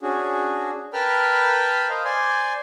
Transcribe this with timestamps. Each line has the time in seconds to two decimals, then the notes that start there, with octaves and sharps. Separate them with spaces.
0.02 C#4 D4 F#4 G#4
0.93 A#4 B4 G5 A5 B5 F6
1.89 C5 D#5 F5
2.05 C5 D5 G#5 C6